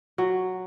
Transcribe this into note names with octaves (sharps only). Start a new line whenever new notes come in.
F#3